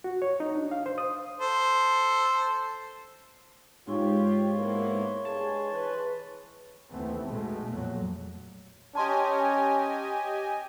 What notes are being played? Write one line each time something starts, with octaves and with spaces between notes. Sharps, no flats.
F#4
C#5
D#4
D4
F5
C5
D#6
A4 C5
G#2 F4 G4 C#5 C6 C#6
A#3 B3 E4
G2 G#3 G#4 A5
E3 B4
F1 D#2 E3 A3 B3 C4
B1 B2 G#3 A3
F2 A#2 F#3
C#4 G4 D#5 G#5 A5 C6